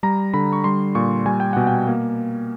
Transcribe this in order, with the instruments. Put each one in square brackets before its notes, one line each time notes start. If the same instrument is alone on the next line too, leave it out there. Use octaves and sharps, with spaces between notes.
[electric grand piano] G3 A#5
D3 B5
C#6
G3 C6
A#2 C#6
G3 G#5
G5
B2 F#5
G5
A#3